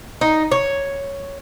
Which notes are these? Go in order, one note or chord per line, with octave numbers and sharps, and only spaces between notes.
D#4
C#5